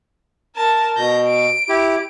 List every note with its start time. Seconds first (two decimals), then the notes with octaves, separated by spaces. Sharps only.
0.56 A#4 A5
0.97 B2 G6 A#6
1.26 D7
1.69 E4 G4